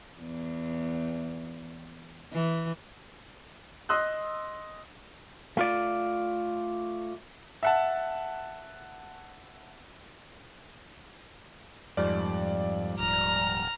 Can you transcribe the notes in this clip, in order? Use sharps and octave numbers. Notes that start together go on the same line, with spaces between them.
E2
E3
D#5 C6 D#6 E6 F#6
A3 F4 D5
E5 F#5 A5
F2 G#2 F3 G3 D5
D#1 A#5 F6